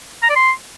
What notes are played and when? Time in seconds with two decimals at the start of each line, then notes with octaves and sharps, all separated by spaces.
0.23 A#5
0.29 D5
0.36 C6